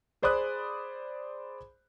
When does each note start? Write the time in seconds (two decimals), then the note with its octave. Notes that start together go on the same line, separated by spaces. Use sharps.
0.22 G#4 C5 D5 B5 D#6 F#6